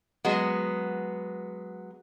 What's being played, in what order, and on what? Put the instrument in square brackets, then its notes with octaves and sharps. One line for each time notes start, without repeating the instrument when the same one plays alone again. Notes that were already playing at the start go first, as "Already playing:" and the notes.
[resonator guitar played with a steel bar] F#3 G#3 B3